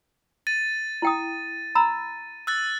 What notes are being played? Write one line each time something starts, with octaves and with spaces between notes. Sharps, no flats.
A6 D#7
E4 G5 D#6
A#5 B5 E6
E6 F#6 A6